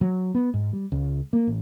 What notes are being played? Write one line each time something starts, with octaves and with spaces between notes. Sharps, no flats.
F#3
B3
G#2
G3
C#2
A#3
A1